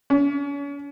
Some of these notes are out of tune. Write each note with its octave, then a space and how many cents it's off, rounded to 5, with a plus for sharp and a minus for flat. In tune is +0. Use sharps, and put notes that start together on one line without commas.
C#4 +40